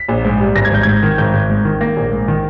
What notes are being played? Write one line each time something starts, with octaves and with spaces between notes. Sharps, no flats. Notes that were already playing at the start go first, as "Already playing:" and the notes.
Already playing: B6
A#1
G#2
G3
G#1 A#6
G#6
G#1 G6
G#2 G#6
D#3
G#1 G6
G#1
G#2
D#3
A#3 A#6
A#1
G#2
D#3